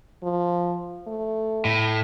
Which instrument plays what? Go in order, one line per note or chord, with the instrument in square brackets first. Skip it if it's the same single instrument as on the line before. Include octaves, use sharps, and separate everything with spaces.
[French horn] F3
A3
[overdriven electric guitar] A2